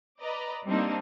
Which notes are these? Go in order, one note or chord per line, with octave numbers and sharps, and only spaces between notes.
B4 D5 D#5 A#5
G3 A#3 C4 D4 D#4